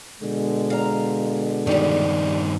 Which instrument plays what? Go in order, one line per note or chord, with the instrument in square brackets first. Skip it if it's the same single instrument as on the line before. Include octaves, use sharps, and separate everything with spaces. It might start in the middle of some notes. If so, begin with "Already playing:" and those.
[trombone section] B2 D3 G#3
[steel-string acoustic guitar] F5 A#5
[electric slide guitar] G2 D#3 D#4 [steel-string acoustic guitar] G3 G4